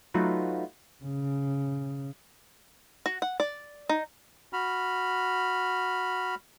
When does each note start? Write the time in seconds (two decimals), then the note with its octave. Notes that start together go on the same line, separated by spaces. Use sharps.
0.14 F#3 A3 D#4 F4 F#4 B4
1.04 C#3
3.06 F#4
3.22 F#5
3.40 D5
3.89 D#4
4.53 F#4 B5 F6